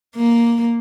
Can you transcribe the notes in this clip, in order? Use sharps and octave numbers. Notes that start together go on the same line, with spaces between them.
A#3